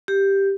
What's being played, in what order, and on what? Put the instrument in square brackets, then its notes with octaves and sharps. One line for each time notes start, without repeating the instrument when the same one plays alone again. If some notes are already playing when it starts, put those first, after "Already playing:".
[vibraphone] G4